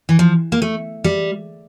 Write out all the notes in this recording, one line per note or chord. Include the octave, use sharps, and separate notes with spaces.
E3
F3
A#3
A3
G3